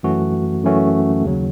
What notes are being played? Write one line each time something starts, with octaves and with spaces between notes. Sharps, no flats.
F#2 E3 A3 C#4 F#4
F#2 E3 A3 C#4 F#4
D#2 C#3 F#3